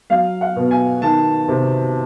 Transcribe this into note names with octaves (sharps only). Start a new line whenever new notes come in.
F#3 F5
F#5
B2
G#5
D#3 A5
C3